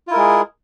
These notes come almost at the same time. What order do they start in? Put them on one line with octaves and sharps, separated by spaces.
F4 E4 A#4 G#3 G#4